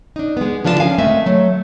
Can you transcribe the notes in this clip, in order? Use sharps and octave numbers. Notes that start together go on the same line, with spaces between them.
D4 D#4
G#3 B3
D3 F3 D4 F4 C5 A5
C#4 A#4 F5 G#5
G#3 A3 C4 E5
F#3 A3